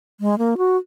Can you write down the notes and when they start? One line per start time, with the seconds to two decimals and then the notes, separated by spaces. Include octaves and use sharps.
0.20 G#3
0.38 A#3
0.57 F#4